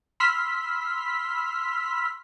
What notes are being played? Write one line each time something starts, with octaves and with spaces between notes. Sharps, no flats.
B5 C6 E6 F6 B6